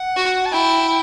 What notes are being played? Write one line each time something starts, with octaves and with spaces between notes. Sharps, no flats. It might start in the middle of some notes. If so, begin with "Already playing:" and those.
Already playing: F#5
F#4
A5
E4 G5